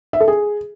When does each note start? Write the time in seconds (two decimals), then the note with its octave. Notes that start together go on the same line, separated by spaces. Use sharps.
0.13 E5
0.20 A4
0.28 G#4